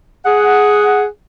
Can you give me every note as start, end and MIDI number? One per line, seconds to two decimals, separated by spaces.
0.25 1.05 68
0.25 1.05 78